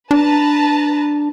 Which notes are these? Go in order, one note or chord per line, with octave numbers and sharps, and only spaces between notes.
D4 B4 A5 A#5